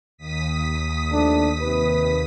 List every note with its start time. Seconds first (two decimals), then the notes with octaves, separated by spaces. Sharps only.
0.17 D#2 D#6 B6
1.11 F3 A3 D4
1.61 C3 B4